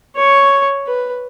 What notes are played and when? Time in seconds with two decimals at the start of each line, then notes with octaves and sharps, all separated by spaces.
0.16 C#5 C#6
0.87 B4